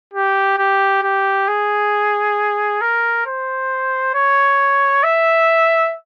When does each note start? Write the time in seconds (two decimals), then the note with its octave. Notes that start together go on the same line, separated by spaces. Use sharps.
0.14 G4
0.58 G4
1.03 G4
1.48 G#4
2.81 A#4
3.26 C5
4.15 C#5
5.03 E5